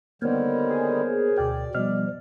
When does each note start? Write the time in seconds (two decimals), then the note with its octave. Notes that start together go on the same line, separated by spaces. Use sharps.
0.22 D3 D#3 G3 A#3 B3 A#4 C5 C#5
0.70 G#4
1.38 D2 B2 D5 G5
1.75 B2 F3 G3 D#5 F6